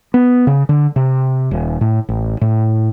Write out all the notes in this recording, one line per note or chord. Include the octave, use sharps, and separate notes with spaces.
B3
C#3
D3
C3
D#1
A2
A1
A2